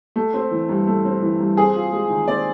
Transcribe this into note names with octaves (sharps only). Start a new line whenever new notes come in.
A3
C4
E3
G2
A3
C4
E3
G2
C4 G#4
F4
G#3
D#3
C4 D5